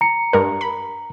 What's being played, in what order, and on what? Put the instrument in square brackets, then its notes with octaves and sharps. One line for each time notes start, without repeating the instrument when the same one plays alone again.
[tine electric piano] A#5 C#7
[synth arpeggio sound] G2 A#4
B5